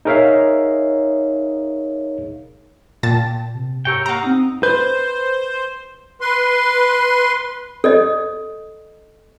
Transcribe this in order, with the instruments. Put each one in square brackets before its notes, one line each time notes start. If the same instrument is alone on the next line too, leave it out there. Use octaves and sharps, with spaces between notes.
[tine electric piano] D#4 G#4 A#4 C#5 E5 F5
[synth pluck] A#2 A5 A6 [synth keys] G5
[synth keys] C3
[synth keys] G#2 G4 E6 [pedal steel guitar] A#4 C#5 G5
[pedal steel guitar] A#3 F5 [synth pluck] F#5 A#5
[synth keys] C4 D#4 [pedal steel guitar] D#6
[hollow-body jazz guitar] B4 [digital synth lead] C5 [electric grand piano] G6
[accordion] B4 C6
[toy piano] A4 D5 D#5